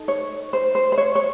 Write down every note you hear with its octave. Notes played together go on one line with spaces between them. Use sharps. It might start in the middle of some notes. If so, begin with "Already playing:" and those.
Already playing: D#4 A4
C#5
C5
C5
C5
C#5
C#5